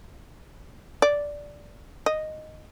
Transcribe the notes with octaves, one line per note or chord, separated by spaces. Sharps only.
D5
D#5